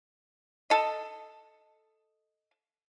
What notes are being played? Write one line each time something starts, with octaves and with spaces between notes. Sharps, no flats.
A4 D#5